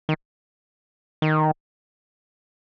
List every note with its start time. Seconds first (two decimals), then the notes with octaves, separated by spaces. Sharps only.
0.09 D#3
1.22 D#3